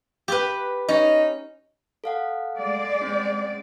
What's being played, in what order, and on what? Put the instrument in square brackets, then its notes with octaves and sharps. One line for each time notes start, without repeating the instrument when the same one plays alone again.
[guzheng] G4 B4
[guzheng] C#4 [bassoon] D#4
[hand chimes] A4 F5 F#5
[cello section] G#3 D5
[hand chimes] C4 C#4